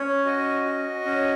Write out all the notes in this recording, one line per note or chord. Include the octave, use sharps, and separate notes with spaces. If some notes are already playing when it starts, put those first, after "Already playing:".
Already playing: C#4 C#5
F#4 D#5
F#4
C#4